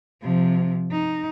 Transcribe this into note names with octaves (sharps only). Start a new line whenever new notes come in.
C3 F3
D#4